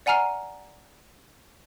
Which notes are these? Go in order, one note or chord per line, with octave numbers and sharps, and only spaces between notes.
D5 F#5 G#5 A#5 F6 C7